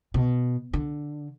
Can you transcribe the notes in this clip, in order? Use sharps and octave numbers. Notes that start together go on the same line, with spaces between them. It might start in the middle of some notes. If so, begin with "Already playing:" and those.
B2
D3